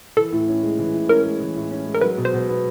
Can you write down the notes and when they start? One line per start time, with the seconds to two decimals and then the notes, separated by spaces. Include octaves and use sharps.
0.17 E3 A4
0.32 A2
0.48 C#4
0.63 G#3
0.79 E3
0.94 A2
1.09 C#4 A#4
1.25 G#3
1.40 E3
1.56 A2
1.71 C#4
1.87 G#3
1.95 A#4
2.01 F#3 B4
2.17 B2
2.25 C5
2.33 B2
2.49 B3